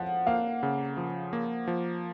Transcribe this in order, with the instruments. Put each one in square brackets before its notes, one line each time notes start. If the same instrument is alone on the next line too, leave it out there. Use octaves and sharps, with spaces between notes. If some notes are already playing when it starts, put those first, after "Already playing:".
Already playing: [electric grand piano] F3 [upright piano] F#5
[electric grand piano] A#3 [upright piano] F5
[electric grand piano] C#3
F3
A#3
F3